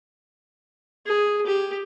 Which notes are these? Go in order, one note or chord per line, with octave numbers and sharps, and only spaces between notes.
G#4
G4